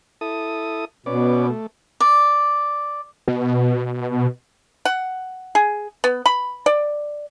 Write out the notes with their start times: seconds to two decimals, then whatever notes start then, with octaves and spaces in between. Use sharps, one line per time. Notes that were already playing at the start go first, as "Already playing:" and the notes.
0.21 E4 A4 D#6
1.06 B2 B3 C#4 D5
1.50 A3
2.00 D5
3.28 B2
4.85 F#5
5.55 G#4
6.04 B3
6.26 B5
6.66 D5